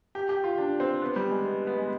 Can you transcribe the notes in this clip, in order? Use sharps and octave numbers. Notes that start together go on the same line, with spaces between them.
G4
G4
F4
D4
C4
B3
G3
G#3
B3
B3
G#3